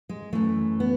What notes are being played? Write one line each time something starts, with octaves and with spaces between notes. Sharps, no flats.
G#3
F#2 E3 A3
B3